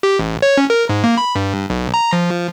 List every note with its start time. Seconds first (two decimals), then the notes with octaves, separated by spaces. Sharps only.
0.03 G4
0.19 A1
0.42 C#5
0.57 C#4
0.70 A#4
0.89 G#2
1.04 A#3
1.18 B5
1.35 G2
1.70 B1
1.94 A#5
2.13 F3